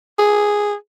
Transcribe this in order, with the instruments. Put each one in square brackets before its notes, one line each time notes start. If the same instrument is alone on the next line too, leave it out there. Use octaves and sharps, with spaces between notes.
[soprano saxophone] G#4